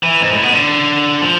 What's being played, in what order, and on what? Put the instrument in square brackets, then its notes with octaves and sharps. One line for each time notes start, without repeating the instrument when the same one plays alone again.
[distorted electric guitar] E3
G#2
A2
B2
D3
F3